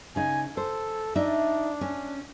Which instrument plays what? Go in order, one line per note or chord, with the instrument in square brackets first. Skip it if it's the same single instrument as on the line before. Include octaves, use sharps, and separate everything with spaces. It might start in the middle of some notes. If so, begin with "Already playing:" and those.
[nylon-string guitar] C#3 D#4 [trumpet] G#5
[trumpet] A4 [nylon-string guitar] C5
[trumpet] D4 [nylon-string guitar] D#4 D5 E5
[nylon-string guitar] C#4